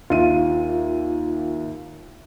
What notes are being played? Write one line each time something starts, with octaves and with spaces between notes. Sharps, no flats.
D#2 F4 E5 D#7